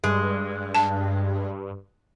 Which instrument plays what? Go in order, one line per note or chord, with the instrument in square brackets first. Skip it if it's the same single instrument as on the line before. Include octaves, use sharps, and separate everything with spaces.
[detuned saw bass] G2 [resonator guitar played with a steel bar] G#3
[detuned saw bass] G2
[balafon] A5